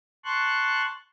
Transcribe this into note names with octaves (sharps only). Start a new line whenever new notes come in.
A5 C6 C#6 F#6